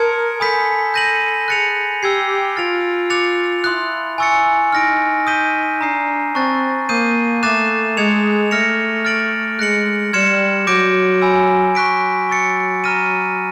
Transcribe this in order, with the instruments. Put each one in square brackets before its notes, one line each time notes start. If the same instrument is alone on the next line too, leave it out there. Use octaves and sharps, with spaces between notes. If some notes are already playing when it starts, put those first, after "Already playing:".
Already playing: [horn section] A#4 [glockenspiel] A5 C6 D#6 G#6 C#7
[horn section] A4 [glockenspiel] G#5 B5 D#6 G6 B6
[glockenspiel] G6 A#6 D#7 F#7
[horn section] G#4 [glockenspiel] F#6 A6 C#7 F7
[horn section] G4 [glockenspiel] E6 G#6 C7
[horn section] F4 [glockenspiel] F6 A6 D7 F7
[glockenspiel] D6 F#6 A6 C#7 F7
[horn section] E4 [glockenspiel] C6 D#6 F#6
[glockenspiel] G#5 C#6 E6 A6 C#7
[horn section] D#4 [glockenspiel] F6 A#6 D7
[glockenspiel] D#6 G6 B6 D#7 G7
[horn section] D4 [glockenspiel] A#5 D#6 G6 C7
[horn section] C4 [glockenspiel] A5 C#6 F#6 A6
[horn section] A#3 [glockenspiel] D#6 G6 C7 D#7
[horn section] A3 [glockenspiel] D6 F#6 A6 C7 E7
[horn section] G#3 [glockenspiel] D#6 G#6 C#7 F7
[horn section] A3 [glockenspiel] F6 A#6 C#7 F7
[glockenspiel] F6 A6 D7 F#7
[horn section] G#3 [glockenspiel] F#6 A#6 C#7 F#7
[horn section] G3 [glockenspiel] C6 F6 G#6 C#7 E7
[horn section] F#3 [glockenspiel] D6 G6 A#6 D7
[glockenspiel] G#5 B5 E6
[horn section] F#3 [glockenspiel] C#6 F#6 B6 D7
[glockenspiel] C#6 E6 A6 C#7
A#5 C#6 F6 A#6 D#7